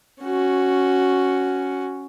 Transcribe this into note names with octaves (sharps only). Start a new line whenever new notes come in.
C#4 F#4